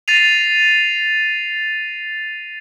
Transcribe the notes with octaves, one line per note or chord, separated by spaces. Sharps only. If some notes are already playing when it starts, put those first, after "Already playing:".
A6 A#6 C7 D#7 F7